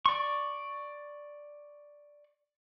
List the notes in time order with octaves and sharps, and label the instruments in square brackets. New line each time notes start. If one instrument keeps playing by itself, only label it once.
[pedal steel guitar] D5 C#6